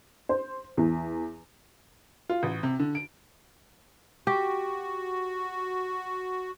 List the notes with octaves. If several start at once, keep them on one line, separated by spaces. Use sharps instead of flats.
C5
E2
F4
A1
C3
D3
D7
F#4 G4